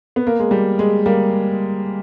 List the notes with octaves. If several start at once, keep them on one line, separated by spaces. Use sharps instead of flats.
B3
A#3
G#3
G3
G#3
G3 A#3